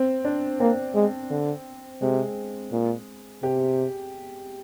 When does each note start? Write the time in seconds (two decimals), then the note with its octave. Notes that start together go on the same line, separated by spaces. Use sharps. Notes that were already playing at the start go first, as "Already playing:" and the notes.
Already playing: C4
0.25 D4
0.60 A#3 C4
0.95 G#3
1.31 D3
2.02 C3 G#3
2.72 A#2
3.43 C3 G4